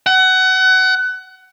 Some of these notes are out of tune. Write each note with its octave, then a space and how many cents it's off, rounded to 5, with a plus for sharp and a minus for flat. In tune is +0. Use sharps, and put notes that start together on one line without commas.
F#5 +25